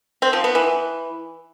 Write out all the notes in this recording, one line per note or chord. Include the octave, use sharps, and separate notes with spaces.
C4
F3
B3
E3